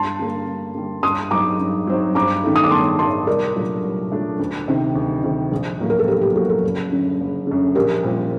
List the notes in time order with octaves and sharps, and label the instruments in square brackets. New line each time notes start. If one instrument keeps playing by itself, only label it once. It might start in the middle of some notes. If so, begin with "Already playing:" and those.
Already playing: [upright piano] G2 [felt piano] A5 C6
[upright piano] D3 G3 A#3
G2
D3 G3 A#3
[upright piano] G2 [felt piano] C6 D#6
[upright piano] F#3 C4 D#4 [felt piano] A#5 D6
[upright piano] G2
F#3 C4 D#4
[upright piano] G2 [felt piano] A#5 D6
[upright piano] D#3 A3 D#4 A4
[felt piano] D#6
D6
[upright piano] G2 [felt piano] A5 C6
[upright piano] D#3 A3 D#4 A4 [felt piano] A5 C6
[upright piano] C2 [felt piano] A#4 D5
[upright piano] A#2 F#3 A3 D4
C2
A#2 F#3 A3 D4
D2
C3 D#3
D2
C3 D#3
A#1
A2 F#3 A#3 F#4
[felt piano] A#4
A4
[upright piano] A#1 [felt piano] G4
[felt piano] G4
[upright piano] A2 F#3 A#3 F#4 [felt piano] A4
[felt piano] A4
[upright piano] F#1
F#2 D3
F#1
F#2 D3
[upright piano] A#1 [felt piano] G4 A#4
[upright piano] A#2 G3 C4